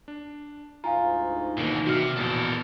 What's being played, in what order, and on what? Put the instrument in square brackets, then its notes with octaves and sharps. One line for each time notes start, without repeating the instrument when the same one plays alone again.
[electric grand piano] D4
[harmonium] D2 G#2 D#4 [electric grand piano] F4 [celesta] F5 G#5 A#5
[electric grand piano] A1 D#3 A#3 [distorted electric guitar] B2 E3
[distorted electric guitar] C3 [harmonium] G3 [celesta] F#4 F6
[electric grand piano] A#1 E2 B2 [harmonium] A#3 [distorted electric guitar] A4 A#4